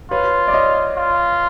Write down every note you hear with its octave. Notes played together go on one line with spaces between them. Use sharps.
F4 B4 C#5
D5
C#5 D#5
F4